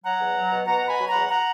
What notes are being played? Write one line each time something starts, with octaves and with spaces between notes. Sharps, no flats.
F#3 F#5 A#5
E2
F#3
B2
B2 F#5 A#5
B2 G#5 B5
F#3
E2 F#5 A#5
F#5 A#5